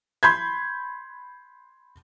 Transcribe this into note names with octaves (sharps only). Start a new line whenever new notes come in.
B5 C6 G6 G#6